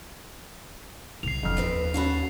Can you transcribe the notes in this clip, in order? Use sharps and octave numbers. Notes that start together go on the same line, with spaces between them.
C2 C7 F7
F1 F2 F6
D#2 F3 C4 B4
C#4 F#4 A4 F5 B5